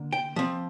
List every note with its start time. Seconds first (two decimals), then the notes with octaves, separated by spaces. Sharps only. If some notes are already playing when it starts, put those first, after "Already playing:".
Already playing: D3 A#3 D4
0.13 G5
0.36 F3 C4